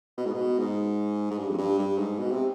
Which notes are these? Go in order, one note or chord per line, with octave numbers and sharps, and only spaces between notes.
B2
G#2
B2
G#2
G#2
G2
F2
G2
G2
G#2
B2
C3